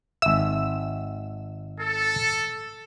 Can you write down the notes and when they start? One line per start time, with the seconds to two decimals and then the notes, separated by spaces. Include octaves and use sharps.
0.22 G#1 E5 E6
1.80 A4